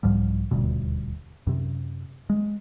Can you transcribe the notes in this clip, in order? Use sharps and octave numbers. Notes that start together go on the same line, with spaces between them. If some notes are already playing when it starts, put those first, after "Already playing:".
C2 G#2 F3 G3
D#1 D2 G2 B2
F#2 C3
G#3